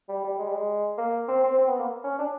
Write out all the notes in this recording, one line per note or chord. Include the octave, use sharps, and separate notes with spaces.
G3
G3
G#3
G3
G#3
A#3
C4
C4
C4
B3
A#3
C#4
D4